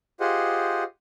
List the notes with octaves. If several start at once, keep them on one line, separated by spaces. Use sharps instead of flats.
F4 G4 G#4 C5 D#5 F#5